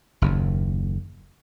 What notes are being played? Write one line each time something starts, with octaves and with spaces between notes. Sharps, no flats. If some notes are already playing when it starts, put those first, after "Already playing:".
F#1 D#2